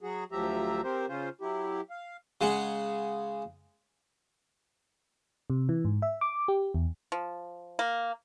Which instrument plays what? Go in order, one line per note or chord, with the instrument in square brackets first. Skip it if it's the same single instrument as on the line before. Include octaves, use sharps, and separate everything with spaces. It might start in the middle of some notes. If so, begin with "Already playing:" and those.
[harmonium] F#3 F#4 G#4
D2 F3 F#3 G4 E5 A#5
C4 G4 A#4 C5
C#3 C#4 F4 C5
F#3 E4 G4
F5
[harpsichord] C#3 G#3 F#5
[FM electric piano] C3
E3
G#2
E5
D6
G4
E2
[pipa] F3
A#3